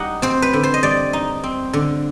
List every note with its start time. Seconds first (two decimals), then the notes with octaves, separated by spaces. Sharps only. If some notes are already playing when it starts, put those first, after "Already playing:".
Already playing: G3 D#4 F#5
0.22 C4 C5
0.42 B4
0.53 D3
0.63 C5
0.74 D#5
0.83 G3 D5
1.13 D#4
1.44 C4
1.73 D3